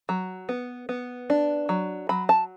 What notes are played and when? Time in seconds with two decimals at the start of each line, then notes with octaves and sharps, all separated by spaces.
0.09 F#3
0.49 B3
0.89 B3
1.30 D4
1.69 F#3
2.09 F#3 B5
2.29 A5